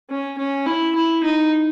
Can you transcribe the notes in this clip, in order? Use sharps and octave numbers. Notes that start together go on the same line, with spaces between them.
C#4
C#4
E4
E4
D#4